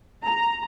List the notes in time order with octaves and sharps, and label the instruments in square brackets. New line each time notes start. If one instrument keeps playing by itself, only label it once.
[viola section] A#5